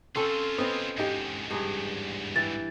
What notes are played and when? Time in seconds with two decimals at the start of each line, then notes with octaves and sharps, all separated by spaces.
0.16 C4 C#4 F4 G#4 A4
0.58 B3 C4 D#5
0.98 E2 G#2 D#4 G4
1.51 G2 G#4
2.36 E3 G5 A6